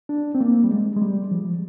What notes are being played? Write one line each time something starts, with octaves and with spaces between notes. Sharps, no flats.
D4
C4
A#3
G3
G#3
G#3
G3
F3